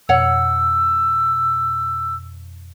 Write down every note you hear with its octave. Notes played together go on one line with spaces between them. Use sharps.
F2 B2 C#5 F#5 E6